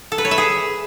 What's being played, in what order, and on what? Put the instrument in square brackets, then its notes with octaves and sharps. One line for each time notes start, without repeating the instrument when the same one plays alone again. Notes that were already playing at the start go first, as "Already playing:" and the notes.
[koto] A4
B4
C#5
E5
G#4